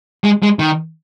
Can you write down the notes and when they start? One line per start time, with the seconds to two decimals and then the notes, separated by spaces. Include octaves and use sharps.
0.24 G#3
0.43 G#3
0.59 D#3